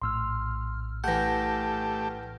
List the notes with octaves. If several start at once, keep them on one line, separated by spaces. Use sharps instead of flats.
A#1 A2 C6 E6 F6
E3 A3 G4 F#5 G6 A#6